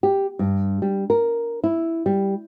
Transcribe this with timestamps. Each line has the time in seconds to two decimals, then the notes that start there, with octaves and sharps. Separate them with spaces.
0.03 G4
0.39 G2
0.82 G3
1.10 A#4
1.64 E4
2.06 G3